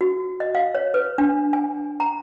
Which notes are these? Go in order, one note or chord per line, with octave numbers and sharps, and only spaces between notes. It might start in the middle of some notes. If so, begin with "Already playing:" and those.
F#4
D#5
F5
C#5
B4
D4
G#5
A#5